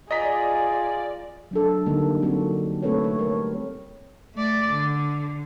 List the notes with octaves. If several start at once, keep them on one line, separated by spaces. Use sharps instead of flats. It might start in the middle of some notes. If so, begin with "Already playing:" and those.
F4 G#4 D5 D#5 A#5 B6
F#3 D4 A4
D3 G3 A#3 D#4
F#3 A#3 C4 F#4
A3 C4 A4 B4 C#5
C#5
G3 A#4 C#5
A3 D5
D3